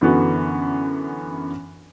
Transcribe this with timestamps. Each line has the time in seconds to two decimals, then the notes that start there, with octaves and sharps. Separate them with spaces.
0.01 F#2 D3 E3 B3 F#4